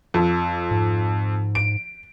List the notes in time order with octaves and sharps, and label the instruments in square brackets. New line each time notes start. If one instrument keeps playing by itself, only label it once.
[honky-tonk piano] F2
[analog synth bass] G#2
[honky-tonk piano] D7